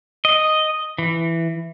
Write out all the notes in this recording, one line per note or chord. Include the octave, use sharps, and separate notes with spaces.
D#5
E3